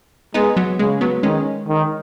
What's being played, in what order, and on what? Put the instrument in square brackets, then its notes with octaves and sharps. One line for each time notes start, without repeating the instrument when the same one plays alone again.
[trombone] G#3 [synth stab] B3 D#4
[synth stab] F#3 B3
[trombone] C#3 [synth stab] G#3
[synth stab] F#3 B3
[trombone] D#3 [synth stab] G#3 C#4
[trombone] D#3